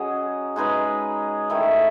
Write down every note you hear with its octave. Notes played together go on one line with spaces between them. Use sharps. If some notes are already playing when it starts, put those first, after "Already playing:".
Already playing: F#3 C#4 G#4 D#5
G#3 D#4 G#4 B4
D#3 A3 E4